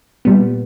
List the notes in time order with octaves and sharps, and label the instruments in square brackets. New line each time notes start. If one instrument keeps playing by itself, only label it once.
[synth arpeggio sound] A#2 G3 B3